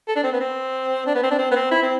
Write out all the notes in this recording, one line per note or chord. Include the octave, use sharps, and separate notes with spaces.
A4
D4
C4
B3
C4
D4
B3
C4
D4
C4
B3
C4
E4
C4